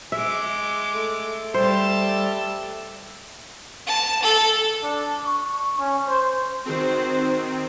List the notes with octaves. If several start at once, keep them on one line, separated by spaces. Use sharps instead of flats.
G#3 E5 D6
A3 A4
G3 G4 C5 A5
A5
A4
D4
C#6
C#4
C5
D#3 C4 F#4 C5